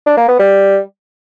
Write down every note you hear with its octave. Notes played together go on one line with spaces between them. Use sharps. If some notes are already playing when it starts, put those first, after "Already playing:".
D4
A#3
B3
G3